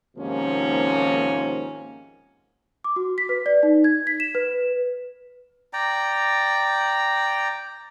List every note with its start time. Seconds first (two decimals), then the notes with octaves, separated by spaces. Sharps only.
0.17 D#2 G#2 C3 F3 A#3 C#4
2.84 D6
2.96 F#4
3.18 B6
3.29 B4
3.46 D5
3.63 D#4
3.84 G#6
4.07 B6
4.20 E7
4.35 B4
5.73 D5 G5 A#5